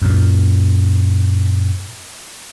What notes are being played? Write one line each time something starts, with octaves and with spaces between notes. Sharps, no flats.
F#2 A#2